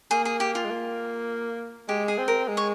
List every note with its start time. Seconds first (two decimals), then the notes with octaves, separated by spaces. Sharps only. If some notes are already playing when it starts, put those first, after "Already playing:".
0.11 A#3 G#4
0.25 G#4
0.40 G4
0.55 F4
0.65 G#3
0.70 A#3
1.89 G#3 G4
2.08 G#4
2.18 C4
2.28 A#4
2.48 G#3
2.57 C#5